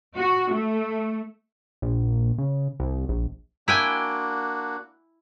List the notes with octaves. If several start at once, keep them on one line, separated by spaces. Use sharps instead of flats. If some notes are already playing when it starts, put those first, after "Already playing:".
F#4
A3
A#1
C#3
C2
A#1
A#3 D4 E4 F#4 G5 G#5